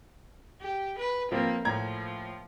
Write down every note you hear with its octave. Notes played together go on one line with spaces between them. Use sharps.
G4
B4
F3 A#3 C4 F4
A2 F3 A#5 G#6